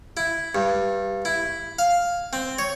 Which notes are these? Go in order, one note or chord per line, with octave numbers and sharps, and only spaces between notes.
E4
G2
E4
F5
C4
C#5